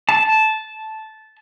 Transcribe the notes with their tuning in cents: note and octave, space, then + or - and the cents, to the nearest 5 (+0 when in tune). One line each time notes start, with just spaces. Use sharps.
A5 -10